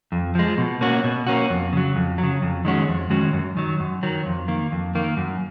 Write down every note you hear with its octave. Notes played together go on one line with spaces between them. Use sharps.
F2
F3 G#3
B2
A#3 C#4 F#4
B2
A#3 C#4 F#4
F2
C#3 F#3
F2
F#3
C#3
F2
D#3 G#3 C#4 F#4
F2
D#3 G#3 C#4 F#4
F#2
D#3 F#3
F#2
D#3 F#3
F2
D#3 A#3
F2
D#3 A#3
F#2